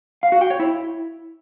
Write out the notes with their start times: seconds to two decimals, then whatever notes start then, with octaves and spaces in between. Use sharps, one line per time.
0.23 F5
0.32 F#4
0.41 G5
0.50 C#5
0.60 E4